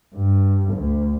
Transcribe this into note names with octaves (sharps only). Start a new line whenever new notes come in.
G2
D2